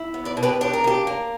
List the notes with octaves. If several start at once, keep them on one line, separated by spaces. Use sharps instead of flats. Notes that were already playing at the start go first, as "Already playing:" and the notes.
Already playing: E4
B3
B4 D5
B2
G4 B4
D4 G4
A#4
A#3 G4
A#3